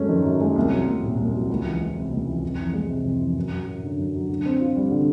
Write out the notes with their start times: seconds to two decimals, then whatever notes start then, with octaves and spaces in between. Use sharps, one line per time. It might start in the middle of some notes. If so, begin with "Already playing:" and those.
Already playing: F#2 G#3 A3 C#4
0.09 D#3
0.25 F#2
0.41 G#3
0.56 C2
0.72 F#3
0.87 C2
1.03 A#2
1.18 C2
1.34 F#3
1.50 C#2
1.65 E3
1.80 C#2
1.96 C3
2.12 C#2
2.27 E3
2.43 F2
2.59 E3
2.74 G#3
2.89 C3
3.05 F2
3.21 E3
3.36 F#2
3.52 F#3
3.68 F#2
3.83 D3
3.99 F#2
4.14 F#3
4.29 D3
4.46 C4
4.61 F4
4.75 G3
4.91 D3